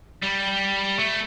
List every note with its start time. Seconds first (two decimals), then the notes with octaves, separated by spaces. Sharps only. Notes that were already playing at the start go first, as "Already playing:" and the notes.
0.22 G3
0.99 A3